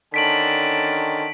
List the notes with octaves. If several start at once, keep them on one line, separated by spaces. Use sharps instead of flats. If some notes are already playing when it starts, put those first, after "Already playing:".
D3 D#3 C#4 A5 B6 D7 F#7